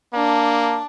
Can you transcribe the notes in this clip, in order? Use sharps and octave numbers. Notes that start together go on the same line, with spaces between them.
A#3 D4 A5